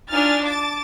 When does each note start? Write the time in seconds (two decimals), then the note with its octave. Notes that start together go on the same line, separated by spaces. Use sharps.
0.10 D4 D#4 F4 G#5 F6 A6
0.43 A5 D6 A6